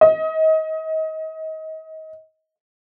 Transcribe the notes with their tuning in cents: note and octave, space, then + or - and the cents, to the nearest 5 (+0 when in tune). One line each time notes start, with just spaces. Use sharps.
D#5 +30